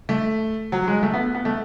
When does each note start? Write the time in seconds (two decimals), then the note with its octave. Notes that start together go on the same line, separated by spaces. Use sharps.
0.09 A3
0.72 F#3
0.88 G#3
1.03 A3
1.14 B3
1.35 B3
1.45 A3